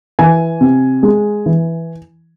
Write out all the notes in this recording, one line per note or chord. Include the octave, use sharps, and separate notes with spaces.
E3 G#5
C3
G#3
E3